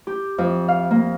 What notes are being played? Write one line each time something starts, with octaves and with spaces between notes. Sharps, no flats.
G4
F2
F5
A#3